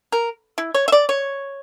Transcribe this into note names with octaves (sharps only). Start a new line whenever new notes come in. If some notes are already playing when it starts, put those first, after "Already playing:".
A#4
E4
C#5
E5
D5
C#5